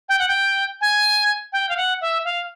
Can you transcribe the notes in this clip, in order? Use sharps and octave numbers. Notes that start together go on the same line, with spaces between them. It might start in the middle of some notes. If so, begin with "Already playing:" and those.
G5
F#5
G5
G#5
G5
F5
F#5
E5
F5